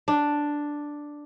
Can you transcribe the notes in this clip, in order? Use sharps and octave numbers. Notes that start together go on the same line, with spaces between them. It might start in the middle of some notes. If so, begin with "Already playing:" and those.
D4